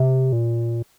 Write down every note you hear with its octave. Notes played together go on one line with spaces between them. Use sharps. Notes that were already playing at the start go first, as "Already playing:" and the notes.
Already playing: C3
A#2